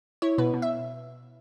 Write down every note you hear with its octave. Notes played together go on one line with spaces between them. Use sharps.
E4 C#5
B2 B4
B2
E5